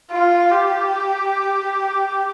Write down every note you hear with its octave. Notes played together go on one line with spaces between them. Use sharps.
F4
G4